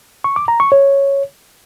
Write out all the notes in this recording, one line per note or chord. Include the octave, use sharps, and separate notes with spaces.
C#6
D6
A#5
C#6
C#5